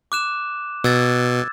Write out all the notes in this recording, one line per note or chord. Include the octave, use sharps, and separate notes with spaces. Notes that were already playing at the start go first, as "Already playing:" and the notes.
D6 F#6 E7
B2 E6 G#6 A6